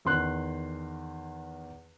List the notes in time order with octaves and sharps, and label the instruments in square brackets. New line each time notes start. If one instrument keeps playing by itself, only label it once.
[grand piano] E2 D#3 C6 F#6